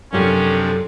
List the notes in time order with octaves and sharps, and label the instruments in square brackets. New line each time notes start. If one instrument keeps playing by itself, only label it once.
[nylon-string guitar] F#2 G4 [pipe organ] C3 F3 D4 [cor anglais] C#4 [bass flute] A4